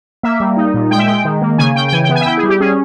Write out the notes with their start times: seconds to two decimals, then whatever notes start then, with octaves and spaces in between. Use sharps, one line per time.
0.23 A#3 E5
0.40 G3
0.57 D#4
0.74 A#2
0.91 G#3 G5
0.99 E5
1.07 G#3 G5
1.25 D#3
1.41 A#3
1.58 C#3 G#5
1.75 C#3 G5
1.88 G5
1.93 E3 G#5
2.04 G5
2.09 B3
2.15 G#5
2.21 E5
2.26 E4 G5
2.38 G#4
2.43 G3
2.49 G4
2.60 C#4 G#4